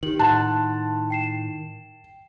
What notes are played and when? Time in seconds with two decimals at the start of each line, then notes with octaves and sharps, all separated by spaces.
0.03 D#3 G4 F#7
0.19 A2 F#5 A5 C6 F#6
1.10 G5 C7 E7